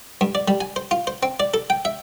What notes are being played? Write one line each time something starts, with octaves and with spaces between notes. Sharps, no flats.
G2
D5
G3
G#5
C5
F4
C5
C4
D5
A4
G5
E5